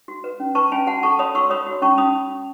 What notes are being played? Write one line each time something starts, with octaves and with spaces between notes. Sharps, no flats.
F#4
B4
C#4
B4 A5 C#6
C#4 G#5 B5
F#4 F#5 A5
A4 A5 C#6
C#5 B5 D#6
F#4 C#6 E6
C#5 B5 D#6
F#4
C#4 A5 C#6
C#4 B5 D#6